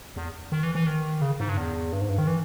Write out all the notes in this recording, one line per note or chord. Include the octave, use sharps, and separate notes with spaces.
E2
D#3
E3
E3
D#3
C#3
G#2
G2
E2
G2
G#2
G2
D#3
E3